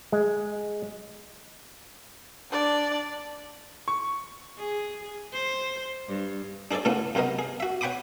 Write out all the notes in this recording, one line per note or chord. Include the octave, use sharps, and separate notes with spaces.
G#3
D4 D5
C#6
G#4
C5
G2
D4 G#4 A4 C#5 D5
A#2 C#3 A3 B3 C#4 E4
F#2 C3 B3 A#4 D#5
G#4
F#4 E5
C#5 F#5 G5 B5 D6 D#6